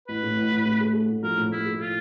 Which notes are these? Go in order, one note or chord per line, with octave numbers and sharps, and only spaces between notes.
A1 B4
A2
A1
A1
A2
A3
A3
A2
F3 A#4
A2
A2 E4
A3
F4